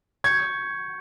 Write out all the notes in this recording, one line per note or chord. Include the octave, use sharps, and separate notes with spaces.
C#6 G6 G#6 C#7